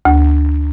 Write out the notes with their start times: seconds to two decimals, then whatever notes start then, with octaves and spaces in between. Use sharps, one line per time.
0.05 D2